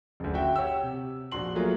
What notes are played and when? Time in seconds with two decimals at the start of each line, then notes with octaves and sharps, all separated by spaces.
0.20 F#1 D2
0.34 F#4 E5 G5
0.56 G4 C#5 F#5 E6
0.83 C3
1.31 A#1 F#4 C6 F#7
1.55 F#3 A3 A#3 F4 F#4 G#4